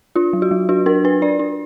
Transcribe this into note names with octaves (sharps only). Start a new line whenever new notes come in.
D4 F4
F#3
F#4
F#3
D4 F#4
D4 A#4
D4 B4
D4 D5
D4